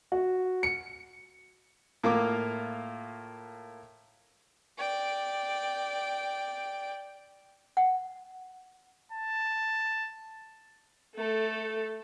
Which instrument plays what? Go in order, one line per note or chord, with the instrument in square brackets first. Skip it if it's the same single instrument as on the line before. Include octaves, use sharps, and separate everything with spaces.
[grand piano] F#4
C#7
[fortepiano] A2 A#3 F4 A#4 D6
[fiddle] D5 G5
[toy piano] F#5
[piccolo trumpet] A5
[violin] A3 A4